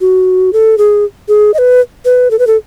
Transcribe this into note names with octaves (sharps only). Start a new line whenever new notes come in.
F#4
A4
G#4
G#4
D#5
B4
B4
A4
B4
A4